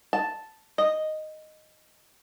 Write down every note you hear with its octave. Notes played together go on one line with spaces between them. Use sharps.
A5
D#5